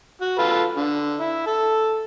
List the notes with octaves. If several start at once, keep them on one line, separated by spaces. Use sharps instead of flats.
F#4
F4 A4 B4
D3
E4
A4